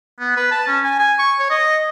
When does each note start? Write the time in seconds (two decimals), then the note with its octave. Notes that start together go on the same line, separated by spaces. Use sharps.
0.20 B3
0.37 B4
0.51 A5
0.67 C#4
0.84 G#5
0.99 G#5
1.19 C#6
1.39 C#5
1.50 D#5